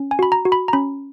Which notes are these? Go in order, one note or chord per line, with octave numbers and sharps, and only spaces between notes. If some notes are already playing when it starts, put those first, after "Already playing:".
Already playing: C#4
G#5
F#4 B5
A#5
F#4
B5
A#5
C#4 B5